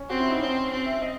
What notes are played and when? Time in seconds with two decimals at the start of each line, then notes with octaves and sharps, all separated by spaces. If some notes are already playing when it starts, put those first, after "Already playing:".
Already playing: C#4
0.10 C4 F#4
0.20 E4
0.30 D#4
0.41 C4 C#4
0.71 C4
0.86 E5
1.02 D#5